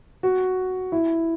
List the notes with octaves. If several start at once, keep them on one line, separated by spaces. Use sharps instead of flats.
F#4
E4